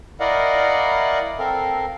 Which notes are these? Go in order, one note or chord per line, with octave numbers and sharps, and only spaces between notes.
E4 A#4 D5 D#5 F5 F#5
C4 A4 A#4 F5